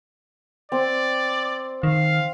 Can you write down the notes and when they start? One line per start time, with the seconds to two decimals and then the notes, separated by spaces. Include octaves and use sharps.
0.72 C4 D5
1.83 D#3 F5